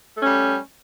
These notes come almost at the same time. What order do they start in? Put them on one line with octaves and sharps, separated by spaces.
A3 C#4 G3